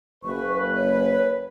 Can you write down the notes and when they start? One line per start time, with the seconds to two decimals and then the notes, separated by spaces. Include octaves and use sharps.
0.24 F#1 B4 C#6
0.76 C#5